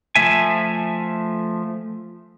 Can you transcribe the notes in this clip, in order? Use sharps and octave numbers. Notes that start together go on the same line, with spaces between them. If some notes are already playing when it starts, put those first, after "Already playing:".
F3 A3 E5 G#5